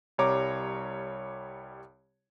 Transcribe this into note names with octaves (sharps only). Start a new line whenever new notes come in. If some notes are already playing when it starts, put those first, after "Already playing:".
C2 G3 C#5 A#5 D6